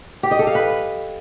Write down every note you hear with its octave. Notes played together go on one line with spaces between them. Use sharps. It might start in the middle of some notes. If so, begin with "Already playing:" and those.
G4
D#5
A4
F5
B4